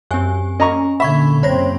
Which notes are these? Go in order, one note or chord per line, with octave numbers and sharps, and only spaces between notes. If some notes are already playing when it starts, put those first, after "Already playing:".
F#2 C4 G4 G#5
C#4 D#5 A#5 C#6
A#2 D3 E5 B5 C#6 G#6
F#1 C#3 C4 C5 C#5 A#6